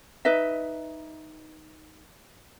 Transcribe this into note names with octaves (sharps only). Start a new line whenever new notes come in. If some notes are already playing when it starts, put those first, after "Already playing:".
D#4 B4 D#5 E5